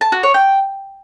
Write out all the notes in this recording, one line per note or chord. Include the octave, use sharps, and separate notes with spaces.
A5
F#4
C#5
G5